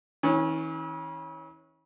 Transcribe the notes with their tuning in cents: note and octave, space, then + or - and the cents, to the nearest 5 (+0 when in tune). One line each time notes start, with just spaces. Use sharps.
E3 -40 C#4 -15